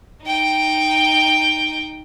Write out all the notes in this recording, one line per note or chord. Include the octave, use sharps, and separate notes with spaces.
D#4 G5